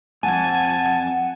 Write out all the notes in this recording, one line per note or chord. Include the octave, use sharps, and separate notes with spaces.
F2 G#2 F#5 G#5 A5